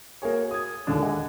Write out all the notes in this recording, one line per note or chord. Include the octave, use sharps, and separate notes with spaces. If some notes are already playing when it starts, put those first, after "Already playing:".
A#3 F#4 G#4 C#5
D#6 G#6
D#2 A#2 D3 G#3 D4
G#4 D#5 F#5